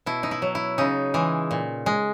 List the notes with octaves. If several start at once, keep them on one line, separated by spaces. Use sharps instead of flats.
B2 E4
D#4
E4
F#3
E4
C#3 D#4
E3 G#3
A#2
G#3